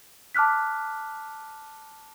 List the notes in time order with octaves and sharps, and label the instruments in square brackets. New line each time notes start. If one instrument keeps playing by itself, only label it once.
[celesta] A5 D6 F6 F#6 B6